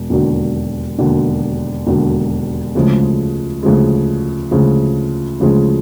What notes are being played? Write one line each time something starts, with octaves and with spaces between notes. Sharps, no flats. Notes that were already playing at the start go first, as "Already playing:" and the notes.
Already playing: E1
E1 D#2 D3 F#3
E1 D#2 D3 F#3
E1 D#2 D3 F#3
D2 C#3 F3 G#3
D2 C#3 F3 G#3
D2 C#3 F3 G#3
D2 C#3 F3 G#3